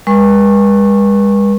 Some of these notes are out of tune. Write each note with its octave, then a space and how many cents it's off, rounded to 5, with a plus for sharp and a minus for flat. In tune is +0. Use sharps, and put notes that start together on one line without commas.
G#3 -40 B4 -40 C#6 -25